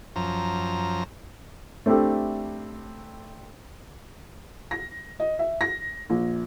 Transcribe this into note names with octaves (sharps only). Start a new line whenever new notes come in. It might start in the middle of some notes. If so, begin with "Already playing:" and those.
F#2 F3 A#5
A3 C4 D4 E4 G4 A4
A#6
D#5
E5
A#6
A#1